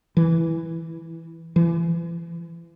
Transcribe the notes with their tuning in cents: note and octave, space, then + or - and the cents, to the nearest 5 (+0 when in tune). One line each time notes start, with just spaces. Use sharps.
E3 +0
E3 +35